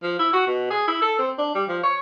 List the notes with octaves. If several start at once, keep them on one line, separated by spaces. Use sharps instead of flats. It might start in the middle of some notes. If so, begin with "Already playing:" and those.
F3
E4
F#4
B2
G#4
E4
A4
C4
D4
G3
F3
C#5